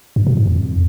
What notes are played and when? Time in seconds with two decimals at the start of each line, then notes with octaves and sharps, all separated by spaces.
0.16 G2
0.27 B2
0.37 G#2
0.47 F2